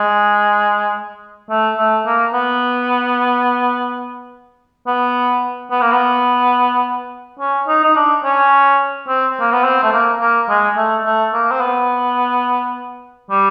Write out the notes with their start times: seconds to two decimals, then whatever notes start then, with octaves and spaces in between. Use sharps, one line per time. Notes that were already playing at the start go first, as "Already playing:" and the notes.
Already playing: G#3
1.50 A3
1.78 A3
2.06 A#3
2.34 B3
4.87 B3
5.71 B3
5.82 A#3
5.92 B3
7.40 C#4
7.68 D#4
7.84 D#4
7.96 D4
8.24 C#4
9.08 C4
9.40 A#3
9.52 B3
9.65 C4
9.83 A3
9.93 A#3
10.21 A#3
10.49 G#3
10.77 A3
11.05 A3
11.34 A#3
11.51 C4
11.61 B3
13.30 G3